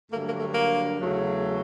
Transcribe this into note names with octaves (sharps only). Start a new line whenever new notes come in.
G2 D3 F#3 A3 A#3
A#3
A3
A#3
E2 C#3 F#3 A3